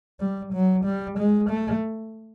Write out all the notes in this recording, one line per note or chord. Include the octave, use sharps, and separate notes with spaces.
G3
F#3
G3
G#3
A3